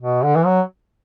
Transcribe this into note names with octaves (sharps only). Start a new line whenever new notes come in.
B2
D3
E3
F#3